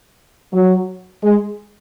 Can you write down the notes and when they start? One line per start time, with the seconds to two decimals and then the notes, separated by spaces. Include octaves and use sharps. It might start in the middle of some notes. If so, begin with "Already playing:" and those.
0.54 F#3
1.23 G#3